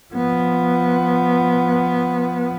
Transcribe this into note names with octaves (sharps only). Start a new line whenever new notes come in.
F3 B3